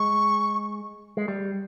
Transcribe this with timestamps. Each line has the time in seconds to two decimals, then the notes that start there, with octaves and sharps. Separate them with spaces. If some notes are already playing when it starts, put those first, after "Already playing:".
Already playing: G#3 C#6
1.17 G#3
1.28 G3